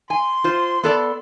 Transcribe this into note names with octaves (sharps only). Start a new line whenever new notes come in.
G#5 C6
F4 C5
B3 A4 D5